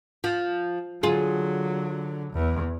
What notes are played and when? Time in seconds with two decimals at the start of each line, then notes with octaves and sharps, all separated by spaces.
0.24 F3
1.03 D3 F#3 F4 G#4
2.33 E2